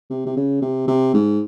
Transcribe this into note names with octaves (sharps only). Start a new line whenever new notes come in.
C3
C3
C#3
C3
C3
G#2